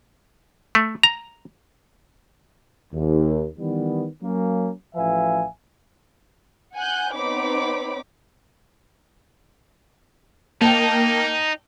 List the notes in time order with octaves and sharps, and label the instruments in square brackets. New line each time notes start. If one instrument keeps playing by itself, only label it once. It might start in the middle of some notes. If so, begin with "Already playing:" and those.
[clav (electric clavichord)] A3
A#5
[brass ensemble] D#2
D#3 E3 G3 B3
F#3 A#3 C#4
A1 F3 B4 E5 F5 G#5
[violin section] F#5 G#5 F#6 G6
B3 C4 D#4 C#5 B5 D6
[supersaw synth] A#3 [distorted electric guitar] D#4 [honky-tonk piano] G5 A5